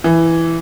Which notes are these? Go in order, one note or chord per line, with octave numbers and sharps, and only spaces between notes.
E3